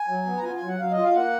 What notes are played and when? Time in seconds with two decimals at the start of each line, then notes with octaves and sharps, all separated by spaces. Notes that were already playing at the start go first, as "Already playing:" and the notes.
Already playing: G#5
0.08 F#3
0.26 B3
0.37 A#5
0.43 F4 G#5
0.56 G#5
0.62 F#3
0.68 F#5
0.79 F#3 F5
0.92 D#5
0.98 F4
1.04 F5
1.15 A#3 F#5